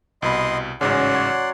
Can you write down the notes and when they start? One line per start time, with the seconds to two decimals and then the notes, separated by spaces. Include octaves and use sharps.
0.22 C2 B2 D#5 B5 C6
0.81 A1 G#2 C#3 F#3 C#4 D5 F#5 C6
1.15 C#5